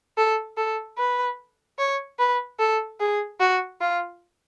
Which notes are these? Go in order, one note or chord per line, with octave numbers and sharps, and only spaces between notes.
A4
A4
B4
C#5
B4
A4
G#4
F#4
F4